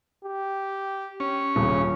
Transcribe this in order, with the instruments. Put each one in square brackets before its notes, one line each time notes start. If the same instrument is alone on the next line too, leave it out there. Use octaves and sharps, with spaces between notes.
[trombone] G4
[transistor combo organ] C#4
[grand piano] D#1 [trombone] C#3